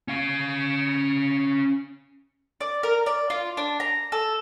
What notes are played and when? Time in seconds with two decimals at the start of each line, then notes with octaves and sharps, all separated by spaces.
0.08 C#4 F5
2.61 D5
2.83 A#4
3.06 D5
3.30 F4
3.57 D4
3.80 A#5
4.12 A4